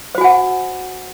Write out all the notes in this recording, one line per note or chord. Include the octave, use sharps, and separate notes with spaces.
F#4 C5 F#5 G#5